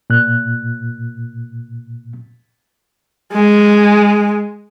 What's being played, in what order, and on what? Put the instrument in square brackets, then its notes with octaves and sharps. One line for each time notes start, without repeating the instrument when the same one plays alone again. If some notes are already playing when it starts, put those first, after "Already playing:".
[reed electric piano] A#2 F#6
[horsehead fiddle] G#3